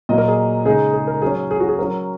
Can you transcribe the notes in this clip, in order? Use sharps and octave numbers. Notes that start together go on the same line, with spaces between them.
A#2 F#3 A#3 D#5
A#4
G#4
C#3 G#3 D#4 G#4
G#4
A#4
F#3 C#4 G#4
G#4
F#4
G#4
F#3 C#4 A#4